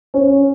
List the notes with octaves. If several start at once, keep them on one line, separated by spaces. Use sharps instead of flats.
C#4